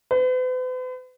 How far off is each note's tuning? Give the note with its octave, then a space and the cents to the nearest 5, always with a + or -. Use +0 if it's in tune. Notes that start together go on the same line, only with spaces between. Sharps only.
B4 +45